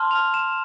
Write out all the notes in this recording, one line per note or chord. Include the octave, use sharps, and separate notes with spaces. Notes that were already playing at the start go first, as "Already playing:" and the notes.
Already playing: A5 C6 F6
F7
E7